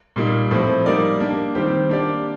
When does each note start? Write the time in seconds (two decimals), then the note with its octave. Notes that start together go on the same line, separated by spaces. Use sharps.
0.16 A#2 G3 A#3 D#4
0.51 A2 F3 C4
0.86 G3 A#3 D#4 A#4 D5
1.20 A#3 D4 G4
1.55 D#3 G3 C4 G4 C5
1.89 A#3 D4 G4 D5